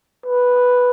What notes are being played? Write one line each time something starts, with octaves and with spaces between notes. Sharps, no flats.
B4